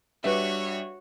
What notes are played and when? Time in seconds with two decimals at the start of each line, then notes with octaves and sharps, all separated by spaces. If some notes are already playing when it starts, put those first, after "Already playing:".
0.24 G3 D4 F#4 B4 C#5 D5 E5